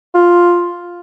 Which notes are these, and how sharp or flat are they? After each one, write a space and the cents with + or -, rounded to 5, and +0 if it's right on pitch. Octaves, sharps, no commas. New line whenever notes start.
F4 +5